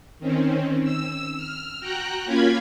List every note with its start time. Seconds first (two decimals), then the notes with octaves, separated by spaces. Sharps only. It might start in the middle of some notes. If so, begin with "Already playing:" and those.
0.19 D#3 C4 C#4
0.84 E6
1.37 F6
1.80 F#4 G5 A#5 F#6
2.25 A#3 C#4 F4 F5 B5 G#6